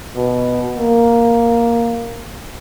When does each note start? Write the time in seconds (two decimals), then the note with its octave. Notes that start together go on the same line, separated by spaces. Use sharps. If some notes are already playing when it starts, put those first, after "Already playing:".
0.16 B2
0.77 A#3